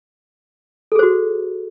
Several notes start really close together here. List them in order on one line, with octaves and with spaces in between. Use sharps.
A4 G#4 C5 F#4